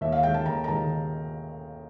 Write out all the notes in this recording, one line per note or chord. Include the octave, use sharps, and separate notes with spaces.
D#2 E5
F5
D#3 G#3 G5
A5
D#2 A#5
A#5
D#3 G#3 A5